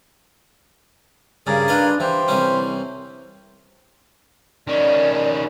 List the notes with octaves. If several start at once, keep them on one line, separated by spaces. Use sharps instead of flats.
G2 C#3 G#4 A#4 D5
D4 F4 B4 D#5
E3 G4 C5
C2 E3 C#4
D#3 C#4 D5